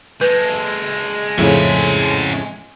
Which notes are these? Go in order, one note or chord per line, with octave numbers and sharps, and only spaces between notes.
G#3 A4 B4
F2 A2 C#3 C#4 E5